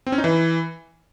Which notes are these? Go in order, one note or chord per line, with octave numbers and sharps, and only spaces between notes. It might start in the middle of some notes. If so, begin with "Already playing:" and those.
C4
C#4
D#4
E3